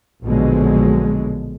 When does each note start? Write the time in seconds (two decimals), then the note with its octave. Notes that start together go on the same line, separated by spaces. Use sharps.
0.24 A#1 B2 D3 F3 F#3 G#3